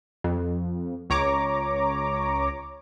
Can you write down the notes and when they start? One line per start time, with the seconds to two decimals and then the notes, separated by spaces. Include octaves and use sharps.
0.24 F2
1.10 C#2 C#5 A#5 D6